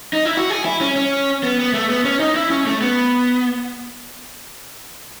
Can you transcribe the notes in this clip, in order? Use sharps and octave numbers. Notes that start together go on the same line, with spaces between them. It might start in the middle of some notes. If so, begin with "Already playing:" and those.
D#4
E4
F#4
G#4
E4
C#4
C#4
B3
B3
A3
B3
C#4
D#4
E4
C#4
A3
B3